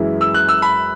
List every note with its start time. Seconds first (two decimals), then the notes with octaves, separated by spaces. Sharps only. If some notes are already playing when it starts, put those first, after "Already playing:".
Already playing: F#2 E3 G#3 E4
0.21 E6
0.34 F#6
0.49 E6
0.62 B5